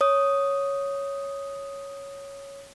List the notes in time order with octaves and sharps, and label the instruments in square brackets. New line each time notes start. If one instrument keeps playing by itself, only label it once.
[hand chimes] C#5 D#6